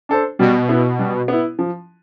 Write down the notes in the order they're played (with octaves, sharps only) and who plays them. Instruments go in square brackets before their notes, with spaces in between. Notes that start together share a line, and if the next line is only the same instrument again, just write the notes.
[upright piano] D4 A4 C5
[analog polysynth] B2 [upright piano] G3
[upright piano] B3 E4
G3
B3 E4
F3